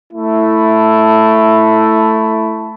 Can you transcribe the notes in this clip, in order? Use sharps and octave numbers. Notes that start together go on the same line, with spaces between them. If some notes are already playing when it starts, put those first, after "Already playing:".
A3 E4